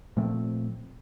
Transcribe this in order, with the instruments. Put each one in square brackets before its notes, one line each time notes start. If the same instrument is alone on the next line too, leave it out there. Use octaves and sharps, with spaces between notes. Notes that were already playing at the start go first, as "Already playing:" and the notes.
[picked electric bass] A#2 F3 A3 C4